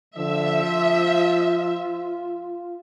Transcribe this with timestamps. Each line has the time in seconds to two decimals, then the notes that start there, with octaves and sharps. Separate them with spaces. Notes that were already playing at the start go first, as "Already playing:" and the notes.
0.17 D3 F3 E5
0.64 F4